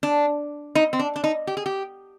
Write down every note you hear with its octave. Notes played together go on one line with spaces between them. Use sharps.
D4
D#4
C4
D4
D4
D#4
G4
G#4
G4